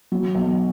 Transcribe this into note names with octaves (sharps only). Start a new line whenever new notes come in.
F#3
B1